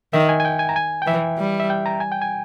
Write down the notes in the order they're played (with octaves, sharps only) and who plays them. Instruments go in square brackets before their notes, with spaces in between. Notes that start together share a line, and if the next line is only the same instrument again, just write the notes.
[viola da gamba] D#3 [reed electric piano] E5
[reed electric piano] G#5
G#5
G5
G#5
A#5
G#5
G5
[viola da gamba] E3 [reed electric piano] E5
[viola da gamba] G3
[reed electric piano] E5
G5
A#5
G#5
G5
G#5